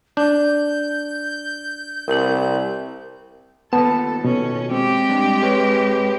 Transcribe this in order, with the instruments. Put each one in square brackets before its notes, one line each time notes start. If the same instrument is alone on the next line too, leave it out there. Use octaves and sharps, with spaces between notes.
[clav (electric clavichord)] D4 [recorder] G6
[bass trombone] C2 [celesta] A#4 F#7
[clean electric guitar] D#2 A#2 A5 [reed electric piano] B3 [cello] A4
[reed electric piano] B2 [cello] C#4
[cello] G#3 G4 [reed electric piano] C4
[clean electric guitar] G2 D4
G#4 B4 C#5